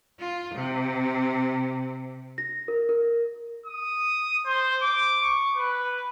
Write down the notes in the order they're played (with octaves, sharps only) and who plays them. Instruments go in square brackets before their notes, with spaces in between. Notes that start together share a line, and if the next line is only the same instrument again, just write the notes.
[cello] F4
C3
[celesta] A#6
A#4
A#4
[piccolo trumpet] D#6
C5
D6
C#6
B4